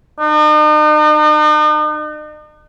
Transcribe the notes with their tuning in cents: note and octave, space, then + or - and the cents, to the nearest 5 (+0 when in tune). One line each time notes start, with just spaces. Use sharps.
D#4 -45